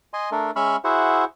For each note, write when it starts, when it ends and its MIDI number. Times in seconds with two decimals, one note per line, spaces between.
0.13 0.30 75
0.13 0.30 80
0.13 0.30 84
0.32 0.51 57
0.32 0.51 62
0.32 0.51 69
0.32 0.51 70
0.56 0.76 56
0.56 0.76 61
0.56 0.76 76
0.56 0.76 83
0.56 0.76 85
0.56 0.76 89
0.84 1.24 64
0.84 1.24 66
0.84 1.24 68
0.84 1.24 72
0.84 1.24 76
0.84 1.24 78